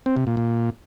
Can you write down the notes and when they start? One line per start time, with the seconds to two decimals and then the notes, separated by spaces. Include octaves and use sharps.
0.06 C4
0.16 C3
0.27 A#2
0.37 A#2